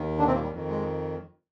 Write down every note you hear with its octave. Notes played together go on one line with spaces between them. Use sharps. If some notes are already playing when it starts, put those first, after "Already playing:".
Already playing: D#2 D#3
D3 D4
C3 C4
A#2 A#3
G3
F2 D#3
G#3